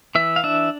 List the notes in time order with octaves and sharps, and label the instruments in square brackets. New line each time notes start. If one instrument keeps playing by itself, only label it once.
[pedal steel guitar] E3 E5
F5
D4 E5